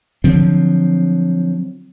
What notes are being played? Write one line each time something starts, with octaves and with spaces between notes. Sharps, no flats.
D3 F3 F#3 C4